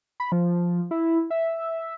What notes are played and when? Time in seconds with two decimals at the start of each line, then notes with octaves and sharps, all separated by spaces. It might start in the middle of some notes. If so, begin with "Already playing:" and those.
0.20 B5
0.32 F3
0.91 E4
1.30 E5